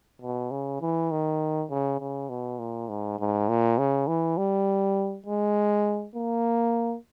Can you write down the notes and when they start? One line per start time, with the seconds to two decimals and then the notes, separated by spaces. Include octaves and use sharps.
0.22 B2
0.51 C#3
0.81 E3
1.11 D#3
1.70 C#3
2.00 C#3
2.30 B2
2.59 A#2
2.89 G#2
3.19 G#2
3.49 A#2
3.78 C#3
4.08 E3
4.37 G3
5.27 G#3
6.15 A#3